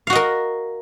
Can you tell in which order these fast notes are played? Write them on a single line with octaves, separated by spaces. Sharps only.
F5 F#4 D#5 A#4